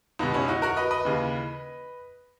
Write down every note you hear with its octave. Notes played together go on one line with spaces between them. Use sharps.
C#2 B2 B3 D#4
C#4 E4
D#4 F#4
F#4 A#4
B4 D#5
B4 D#5
D#2 C#3 E3